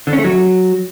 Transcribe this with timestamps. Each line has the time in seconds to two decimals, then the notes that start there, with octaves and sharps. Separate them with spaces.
0.07 D3
0.13 C#4
0.19 A3
0.24 F#3